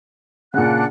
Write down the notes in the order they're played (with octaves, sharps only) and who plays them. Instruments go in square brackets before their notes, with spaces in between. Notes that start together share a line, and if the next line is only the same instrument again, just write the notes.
[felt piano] A#2 C#3 [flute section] D4 F#5 F#6